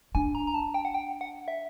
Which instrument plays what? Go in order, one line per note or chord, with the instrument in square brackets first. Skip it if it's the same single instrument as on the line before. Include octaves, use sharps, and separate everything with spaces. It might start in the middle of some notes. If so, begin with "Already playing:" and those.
[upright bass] D4 [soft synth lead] G#5
[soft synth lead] A#5
A#5
A5
G5
F#5
G5
F#5
E5